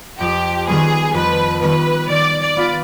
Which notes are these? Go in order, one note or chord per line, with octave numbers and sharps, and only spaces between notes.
F2 G4
D#3 G3 B3 G#4
F2 B4
D#3 G3 B3 B4
D#3 D5
D5
B3 F4 B4